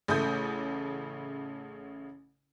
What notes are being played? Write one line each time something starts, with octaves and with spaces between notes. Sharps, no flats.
A1 C#3 A3 A4 D#6 G6